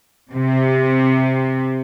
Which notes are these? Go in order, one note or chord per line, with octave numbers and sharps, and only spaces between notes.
C3